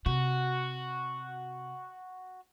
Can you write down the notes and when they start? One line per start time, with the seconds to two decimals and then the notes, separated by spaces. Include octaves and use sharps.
0.06 C3 F#4